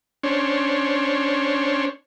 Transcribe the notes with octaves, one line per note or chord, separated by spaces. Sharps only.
C#4 D4 C5 C#5